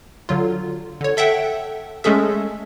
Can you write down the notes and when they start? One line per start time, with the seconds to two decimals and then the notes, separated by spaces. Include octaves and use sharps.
0.29 D3 F#3 F4
1.01 D3 C#5
1.17 A4 E5 F#5 G5
2.04 G#3 A3 C#4 G#4 A4 E5